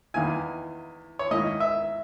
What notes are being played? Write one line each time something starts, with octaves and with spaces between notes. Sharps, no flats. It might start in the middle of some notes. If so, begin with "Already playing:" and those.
E2 D#3 A#3 E4 G#5
C#5
G#2 D#3 A#3 E4 D#5
E5